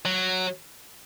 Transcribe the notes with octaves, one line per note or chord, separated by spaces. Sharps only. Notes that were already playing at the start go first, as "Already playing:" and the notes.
F#3